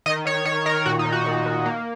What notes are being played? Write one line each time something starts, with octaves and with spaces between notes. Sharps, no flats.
D#3 D#5
D#3 C#5
D#3 C#5
D#3 A#4
A#2 F#4
D#4
A#2
F#4
A#2
A#2
A#3